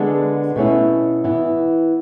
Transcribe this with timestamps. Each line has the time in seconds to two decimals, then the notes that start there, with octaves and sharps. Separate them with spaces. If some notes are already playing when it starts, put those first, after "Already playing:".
Already playing: D3 G#3 B3 D4
0.56 B2 A3 C#4 E4
1.24 E3 B3 E4